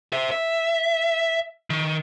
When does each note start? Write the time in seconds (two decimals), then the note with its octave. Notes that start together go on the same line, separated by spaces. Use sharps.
0.13 C5 E5
0.31 E5
1.70 D#3